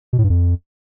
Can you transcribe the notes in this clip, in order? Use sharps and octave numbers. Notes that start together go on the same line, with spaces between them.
B2
A2
G2
F2